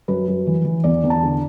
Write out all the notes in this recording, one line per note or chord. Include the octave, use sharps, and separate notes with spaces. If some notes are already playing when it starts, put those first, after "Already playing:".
F#2 B4
F#2
E3
E3
E2 D5
E2
A5
D3